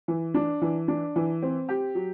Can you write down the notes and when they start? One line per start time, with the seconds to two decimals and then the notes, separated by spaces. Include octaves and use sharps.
0.08 E3
0.34 D4
0.62 E3
0.88 D4
1.16 E3
1.42 C4
1.69 G4
1.95 F#3